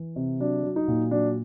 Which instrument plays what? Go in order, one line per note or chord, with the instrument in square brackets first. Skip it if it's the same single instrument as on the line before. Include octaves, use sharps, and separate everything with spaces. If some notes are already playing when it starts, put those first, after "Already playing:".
Already playing: [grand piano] E3
C3
F#3 D4
F#3
D#4
A#2
F#3 D4